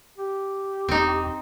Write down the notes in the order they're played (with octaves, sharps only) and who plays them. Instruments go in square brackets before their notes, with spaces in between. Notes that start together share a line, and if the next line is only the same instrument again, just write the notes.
[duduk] G4
[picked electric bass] E1 [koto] C4 D#4